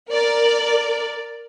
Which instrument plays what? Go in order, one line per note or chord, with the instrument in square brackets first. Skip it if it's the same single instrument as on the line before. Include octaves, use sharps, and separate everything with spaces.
[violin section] A#4 D5